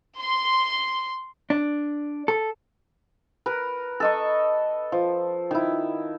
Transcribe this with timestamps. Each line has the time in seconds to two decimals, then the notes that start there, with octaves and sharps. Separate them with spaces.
0.20 C6
1.50 D4
2.28 A4
3.46 A#4 B4
4.00 A4 D#5 C#6
4.92 F3
5.51 D#3 E4